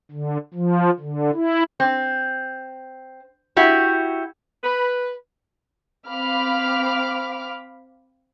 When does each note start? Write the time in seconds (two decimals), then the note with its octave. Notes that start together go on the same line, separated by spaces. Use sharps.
0.12 D3
0.54 F3
1.00 D3
1.34 E4
1.80 C4
3.56 E4 F#4 G4
4.63 B4
6.08 C4 F5 B5 D6 F6